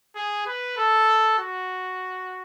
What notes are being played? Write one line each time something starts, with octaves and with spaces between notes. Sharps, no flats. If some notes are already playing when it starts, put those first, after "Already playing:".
G#4
B4
A4
F#4